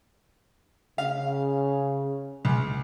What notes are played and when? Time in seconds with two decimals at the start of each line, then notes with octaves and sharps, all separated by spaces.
0.98 C#3 F5
2.45 C#2